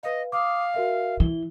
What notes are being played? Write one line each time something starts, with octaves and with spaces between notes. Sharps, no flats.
B4 D#5 F5
F5 D6 D#6
F#4 A#4 E5
E3 G7